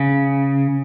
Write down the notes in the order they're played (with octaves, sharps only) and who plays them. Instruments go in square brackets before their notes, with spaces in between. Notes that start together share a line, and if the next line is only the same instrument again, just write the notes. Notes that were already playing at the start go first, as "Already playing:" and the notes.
Already playing: [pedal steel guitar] C#3